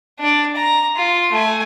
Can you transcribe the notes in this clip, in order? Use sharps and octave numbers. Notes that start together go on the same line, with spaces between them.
D4 D5
A#5
F4
A3 G#5